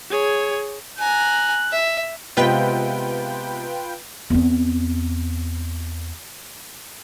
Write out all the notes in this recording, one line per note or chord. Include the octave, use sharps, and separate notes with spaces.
G#4 C#5
G#5 A#5 F#6
E5
C3 G#3 B3 F4 B4 G5
E2 C4